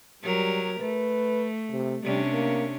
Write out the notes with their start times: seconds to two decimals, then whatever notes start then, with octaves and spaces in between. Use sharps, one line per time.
0.23 F#3 G3 G4 A#4
0.80 A3 B4
1.72 C3
2.03 C3 G3 C#4 D4
2.32 A#3